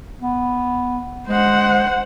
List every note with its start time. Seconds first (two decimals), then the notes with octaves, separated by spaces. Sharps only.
0.21 B3
1.29 G#3 C5 F#5